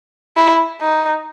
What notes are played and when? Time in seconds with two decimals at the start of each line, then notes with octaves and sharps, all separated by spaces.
0.37 E4
0.81 D#4